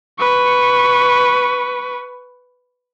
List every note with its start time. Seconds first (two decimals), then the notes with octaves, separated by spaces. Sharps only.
0.19 B4 C#6